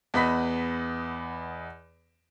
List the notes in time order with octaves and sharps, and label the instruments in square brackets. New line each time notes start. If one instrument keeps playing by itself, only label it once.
[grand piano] E2 B3 D#5 B5 B6